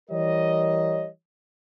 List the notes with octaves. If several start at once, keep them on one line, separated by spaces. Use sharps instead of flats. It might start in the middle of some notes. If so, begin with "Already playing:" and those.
E3 G3 A#4 C#5 D#5